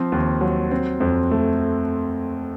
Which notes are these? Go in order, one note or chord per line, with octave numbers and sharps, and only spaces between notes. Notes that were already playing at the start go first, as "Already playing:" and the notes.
Already playing: F3 C4
D#2
F#3
C4
F2
A3